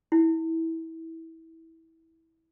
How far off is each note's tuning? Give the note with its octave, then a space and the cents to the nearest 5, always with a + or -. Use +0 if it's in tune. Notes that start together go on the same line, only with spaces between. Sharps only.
E4 -20